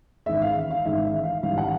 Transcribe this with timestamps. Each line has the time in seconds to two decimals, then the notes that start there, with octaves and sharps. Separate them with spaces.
0.26 A1 G#2 D#3 G#3 E5
0.42 F5
0.71 F5
0.85 A1 G#2 D#3 G#3 E5
1.05 E5
1.23 F5
1.43 A1 G#2 E3 G3 F5
1.58 F#5